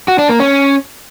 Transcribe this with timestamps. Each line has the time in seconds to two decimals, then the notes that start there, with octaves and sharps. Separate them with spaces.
0.08 F#4
0.19 D4
0.29 A#3
0.40 C#4